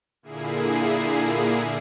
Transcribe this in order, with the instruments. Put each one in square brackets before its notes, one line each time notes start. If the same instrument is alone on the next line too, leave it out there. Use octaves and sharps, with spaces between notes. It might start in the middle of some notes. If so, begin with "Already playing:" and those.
[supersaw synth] A#2 D3 A#3 E4 G#4 C7